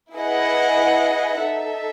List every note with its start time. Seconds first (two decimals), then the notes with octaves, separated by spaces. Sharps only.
0.15 E4 G#4 B4 D#5 F#5
1.42 D#4 A4 E5